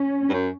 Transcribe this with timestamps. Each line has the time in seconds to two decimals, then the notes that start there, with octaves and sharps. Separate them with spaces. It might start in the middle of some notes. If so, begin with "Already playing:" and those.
Already playing: C#4
0.29 G2
0.34 F#2